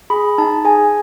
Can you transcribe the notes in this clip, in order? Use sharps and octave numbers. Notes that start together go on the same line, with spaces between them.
G#4 B5
D#4 A5
G#4 G#5